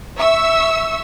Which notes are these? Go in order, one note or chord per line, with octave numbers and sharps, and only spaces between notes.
E5 C#6 E6